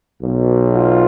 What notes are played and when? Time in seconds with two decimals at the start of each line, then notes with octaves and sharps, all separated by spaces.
0.20 B1 B2
0.76 F4